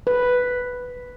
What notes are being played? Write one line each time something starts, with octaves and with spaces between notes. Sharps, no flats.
B4